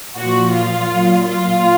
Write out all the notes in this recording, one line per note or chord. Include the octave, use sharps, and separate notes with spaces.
A#2 F3 F#4
F4
A#2 F#3
F4